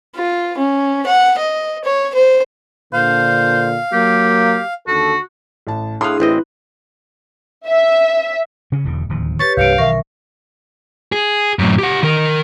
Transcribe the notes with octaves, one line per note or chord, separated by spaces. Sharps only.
F4
C#4
F#5
D#5
C#5
C5
A#2 D3 C5 F5
F#3 A#3 G4
D#2 D3 F#4 A4
A1 A5
A2 D4 E4 G#4 F5 C6 D#6 F#6
A1 C4 E4 B4 D#5
E5
C#3 C#4
E1 E2 D3
D1 D#2 F3
G4 B4 C#5 C#6 A6
C2 G2 E3 F5 G6 C#7 D7
B1 D#3 E3 A#4 E5 C#6
G#4
F#2 A2
G4 F#5
D#3 A#4